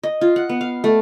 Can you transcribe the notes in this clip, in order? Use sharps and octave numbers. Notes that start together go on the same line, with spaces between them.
D#5
F4
F#5
B3
F5
A3